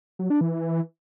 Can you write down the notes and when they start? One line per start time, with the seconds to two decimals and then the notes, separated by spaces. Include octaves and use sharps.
0.19 F#3
0.30 D4
0.41 E3